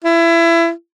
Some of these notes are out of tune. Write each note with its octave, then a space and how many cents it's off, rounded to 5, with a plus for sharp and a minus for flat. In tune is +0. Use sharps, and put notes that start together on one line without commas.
E4 +25